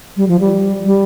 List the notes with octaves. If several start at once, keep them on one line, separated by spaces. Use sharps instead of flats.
G3
F3
G3
G3